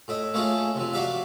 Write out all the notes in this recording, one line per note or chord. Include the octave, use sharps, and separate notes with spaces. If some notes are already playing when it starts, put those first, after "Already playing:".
A2 E4 D#5
A3 A#3 C#4 E4 F4 G#4
C3 F3
F#3 F#4 D5 E5 F5